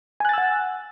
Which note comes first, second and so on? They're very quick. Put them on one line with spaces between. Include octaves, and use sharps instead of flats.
G#5 F#6 A6 E6 F#5